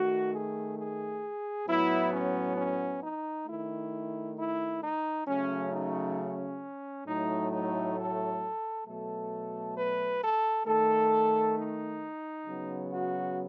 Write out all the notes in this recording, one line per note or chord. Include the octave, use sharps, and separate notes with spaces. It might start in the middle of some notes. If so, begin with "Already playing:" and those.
Already playing: D#3 A3 F#4
G#4
G#4
A2 F#3 B3 E4
C#4
C#4
D#4
D#3 A3 E4
E4
D#4
C#3 F#3 A3 C#4
D#4
C#4
A2 F#3 A3 D#4
D#4
A4
B2 F#3 A3 A4
B4
A4
D#3 A3 A4
D#4
C#3 F#3 B3
F#4